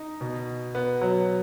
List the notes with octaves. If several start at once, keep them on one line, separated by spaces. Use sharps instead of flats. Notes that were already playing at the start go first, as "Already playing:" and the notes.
Already playing: D#4
B2
B3
F#3